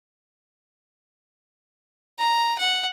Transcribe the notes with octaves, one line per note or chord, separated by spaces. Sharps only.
A#5
F#5